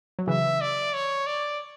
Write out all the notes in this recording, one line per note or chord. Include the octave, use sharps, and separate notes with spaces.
F#3
C#3 E3 E5
D5
C#5
D5